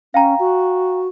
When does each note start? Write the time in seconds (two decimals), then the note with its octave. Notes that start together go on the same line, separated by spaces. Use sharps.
0.14 C#4 F5 G5 A#5
0.39 F#4